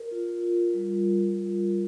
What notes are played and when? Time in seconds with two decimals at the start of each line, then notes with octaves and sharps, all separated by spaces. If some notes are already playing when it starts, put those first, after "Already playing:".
Already playing: A#4
0.11 F4
0.42 F4
0.74 G3